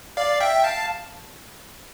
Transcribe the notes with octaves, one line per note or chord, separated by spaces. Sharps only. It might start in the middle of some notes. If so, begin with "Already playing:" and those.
D5 F5
E5 G5
F5 A5